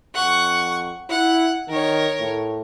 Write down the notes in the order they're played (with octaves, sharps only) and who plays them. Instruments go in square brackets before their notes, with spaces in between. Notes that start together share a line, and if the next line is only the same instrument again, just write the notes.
[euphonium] F2 [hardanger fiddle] F#5 C#6
[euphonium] E4 [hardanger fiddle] F#5
[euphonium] D#3 [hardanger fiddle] A#4 C#5
[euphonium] A2